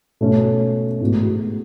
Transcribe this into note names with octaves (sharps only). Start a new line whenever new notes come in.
B2 A3 C#4
A1 A2 G#3 B3 F#4